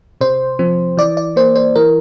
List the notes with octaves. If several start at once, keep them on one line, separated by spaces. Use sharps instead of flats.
C3 C5
F3 C4
E3 D5
D5
A#3 C5
C5
E3 A#4